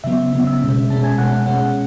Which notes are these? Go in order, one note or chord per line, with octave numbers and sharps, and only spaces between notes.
C#3 F#3 B3 E5
C#3 F#3 B3
E5
B2 G#3 C#4
B2 G#3 C#4 A5
G#5
B2 G#3 C#4 F#5
B2 G#3 C#4 F#5